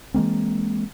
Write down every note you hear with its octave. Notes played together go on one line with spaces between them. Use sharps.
E3 G#3 A#3 C4